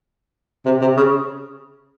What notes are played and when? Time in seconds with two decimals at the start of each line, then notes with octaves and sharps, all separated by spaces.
0.65 C3
0.81 C3
0.97 C#3